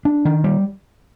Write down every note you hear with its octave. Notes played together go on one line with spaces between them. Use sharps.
D4
D#3
G3